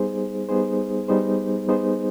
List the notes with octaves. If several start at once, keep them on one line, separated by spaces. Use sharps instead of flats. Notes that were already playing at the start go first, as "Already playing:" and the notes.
Already playing: G3 B3 D#4 G#4 C5
G3 B3 D#4 G#4 C5
G3 B3 D#4 G#4 C5
G3 B3 D#4 G#4 C5